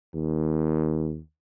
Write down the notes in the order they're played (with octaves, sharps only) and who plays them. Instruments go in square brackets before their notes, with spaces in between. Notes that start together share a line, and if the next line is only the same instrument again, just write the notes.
[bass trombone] D#2